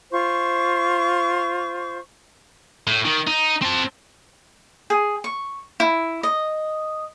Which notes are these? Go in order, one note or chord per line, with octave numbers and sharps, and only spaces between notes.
F4 C5 C#6
A2
D#3
D#4
C4 A5
G#4
C#6
E4
D#5